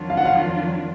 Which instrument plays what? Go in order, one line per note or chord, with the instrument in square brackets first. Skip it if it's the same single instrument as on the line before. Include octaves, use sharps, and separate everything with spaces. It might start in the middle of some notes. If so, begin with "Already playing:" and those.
Already playing: [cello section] F2 D#3 F#3 D4 F4
[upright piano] F5
F#5
F5